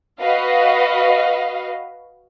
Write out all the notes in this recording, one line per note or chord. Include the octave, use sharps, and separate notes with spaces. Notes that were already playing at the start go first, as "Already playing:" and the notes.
F#4 B4 D#5 F5